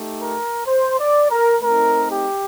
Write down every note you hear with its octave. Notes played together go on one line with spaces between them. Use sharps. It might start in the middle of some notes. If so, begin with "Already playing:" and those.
Already playing: A3 D#4 G4
A#4
C5
D5
A#4
A3 C4 D#4 A#4
G4